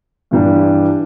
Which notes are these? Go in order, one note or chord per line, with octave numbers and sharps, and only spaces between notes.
G2 E3 G3 D4